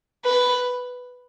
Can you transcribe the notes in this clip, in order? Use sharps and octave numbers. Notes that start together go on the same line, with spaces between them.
B4